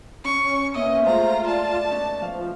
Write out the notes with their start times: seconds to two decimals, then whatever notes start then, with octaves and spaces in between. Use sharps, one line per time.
0.25 C#4 C#6
0.75 A#2 B3 E4 D#5
1.05 G#3 A3 F4 G#4 C5 A#5
1.47 D5 A5
1.90 B2 C#4 D#4
2.22 F3 F5